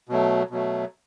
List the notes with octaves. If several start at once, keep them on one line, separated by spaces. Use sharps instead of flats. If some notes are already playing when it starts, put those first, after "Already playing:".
B2 F#3 A3
B2 F#3 A3